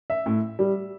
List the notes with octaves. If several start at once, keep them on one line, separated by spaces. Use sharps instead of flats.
E5
A2
G3